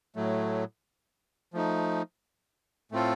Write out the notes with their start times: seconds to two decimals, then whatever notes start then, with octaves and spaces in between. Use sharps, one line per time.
0.16 A2 F#3 A3
1.54 F3 A3 D#4
2.92 A2 A3 C4 F4 A4